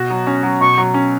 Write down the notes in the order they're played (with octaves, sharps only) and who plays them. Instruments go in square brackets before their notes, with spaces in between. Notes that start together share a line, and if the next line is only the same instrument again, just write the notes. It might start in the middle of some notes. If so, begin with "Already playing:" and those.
Already playing: [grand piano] B2 F#4
F#3
C#4
F#3
[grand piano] B2 [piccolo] C#6
[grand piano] F#3
C#4